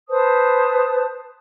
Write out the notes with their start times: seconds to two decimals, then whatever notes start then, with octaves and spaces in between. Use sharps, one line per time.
0.09 B4 C5 A5 D#6